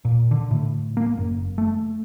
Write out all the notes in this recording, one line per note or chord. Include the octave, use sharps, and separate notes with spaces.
A#2
D3
A2
A#3
F#1
A3